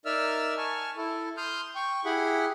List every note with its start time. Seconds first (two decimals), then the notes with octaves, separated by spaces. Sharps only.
0.05 D#4 A#4 D5 E5 E6 F6
0.58 G#5 A5 C#6 F6
0.97 E4 A4
1.37 C6 D#6 F6 G6
1.75 G5 C#6
2.05 E4 G4 G#4 F#5 B5